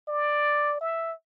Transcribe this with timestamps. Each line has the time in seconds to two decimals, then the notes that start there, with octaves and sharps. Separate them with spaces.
0.08 D5
0.81 E5